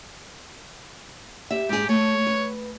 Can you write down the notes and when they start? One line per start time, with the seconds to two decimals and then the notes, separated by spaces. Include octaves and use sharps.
1.51 G4 E5
1.69 G#2 G4 G#4
1.89 A3 C#5
2.27 B4